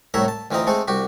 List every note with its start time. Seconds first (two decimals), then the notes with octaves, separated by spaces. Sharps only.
0.14 C2 A2 A3 C#5 E5 A#5
0.28 A5
0.51 D2 E3 C4 F4 D#5 A#5
0.67 G#3 A3 C4 A4 C5
0.88 C2 F#4 G4